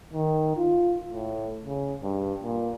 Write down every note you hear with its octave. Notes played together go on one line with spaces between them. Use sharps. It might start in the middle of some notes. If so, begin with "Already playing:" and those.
D#3
F4
A2
C#3
G2
A#2